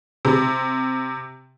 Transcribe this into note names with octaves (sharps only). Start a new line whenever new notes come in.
C3